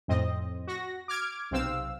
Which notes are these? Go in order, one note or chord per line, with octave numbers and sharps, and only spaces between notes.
F2 A2 C4 D#5
F#4 A#6
D6 F6 G#6 D7
B1 C3 C4 F5 E6